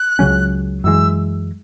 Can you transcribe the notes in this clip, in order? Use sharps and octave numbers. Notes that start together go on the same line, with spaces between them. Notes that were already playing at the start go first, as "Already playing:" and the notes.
Already playing: F#6
C#2 C#3 F#3 C#4
F#2 E3 G#3 E6